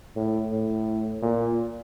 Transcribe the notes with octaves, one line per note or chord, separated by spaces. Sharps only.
A2
A2
A#2